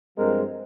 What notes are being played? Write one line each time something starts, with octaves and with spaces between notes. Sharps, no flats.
G2 F3 G#3 C4 A#4